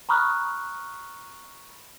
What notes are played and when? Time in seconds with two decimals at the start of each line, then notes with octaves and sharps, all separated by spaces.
0.09 A#5 B5 C#6 D#6 F6 F#6